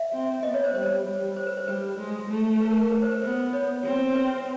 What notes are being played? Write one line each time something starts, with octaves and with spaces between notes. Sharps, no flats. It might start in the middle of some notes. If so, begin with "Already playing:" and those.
Already playing: E5
C4
B3 D#5
C#5
C5
G3 C5
G3
C5
B4
C5
G3 B4
G#3
A3
B4
A#4
A#4
B4
C5
B4
B3 C5
C#5
C4
B4